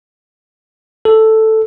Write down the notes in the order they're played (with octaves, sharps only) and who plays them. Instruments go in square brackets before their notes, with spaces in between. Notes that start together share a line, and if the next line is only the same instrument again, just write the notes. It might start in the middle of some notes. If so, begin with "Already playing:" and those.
[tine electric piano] A4